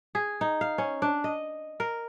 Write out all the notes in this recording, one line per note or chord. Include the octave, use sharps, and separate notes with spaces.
G#4
D#4
F5
C#4
D4
D#5
A#4